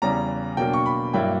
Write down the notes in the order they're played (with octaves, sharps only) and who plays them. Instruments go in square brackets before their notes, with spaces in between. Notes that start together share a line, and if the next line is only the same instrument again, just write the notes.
[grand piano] E2 C#3 G3 A#5
B2 F#3 A#3 D4 G5
C#6
B5
G2 F#3 A#3 E4 G5